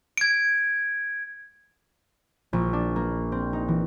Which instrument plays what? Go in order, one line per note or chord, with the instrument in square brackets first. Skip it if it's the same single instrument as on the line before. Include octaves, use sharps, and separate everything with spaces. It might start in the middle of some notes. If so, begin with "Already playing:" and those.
[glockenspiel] G#6 D7
[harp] A#1
D4
A#3
C4
D#4
E3